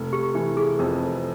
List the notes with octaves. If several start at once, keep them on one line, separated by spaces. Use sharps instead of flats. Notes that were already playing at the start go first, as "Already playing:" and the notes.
Already playing: F1
G4
E3 G4
G#4
F2 A#4